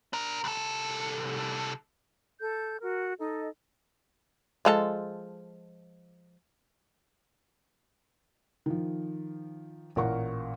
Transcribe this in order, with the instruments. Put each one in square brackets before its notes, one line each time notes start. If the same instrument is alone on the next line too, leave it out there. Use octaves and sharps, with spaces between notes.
[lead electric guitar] D4 A#4
C2 A4
[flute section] A4 G6
F#4 A#4
D#4 A4 D#5
[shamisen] F3 G#3 A4
[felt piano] D#3 F3
A1 A#2 A#4 F5 F#5 C#6